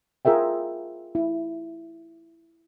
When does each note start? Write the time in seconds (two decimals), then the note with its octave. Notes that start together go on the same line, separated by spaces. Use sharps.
0.25 F4 G#4 A#4 E5 G5
1.15 E4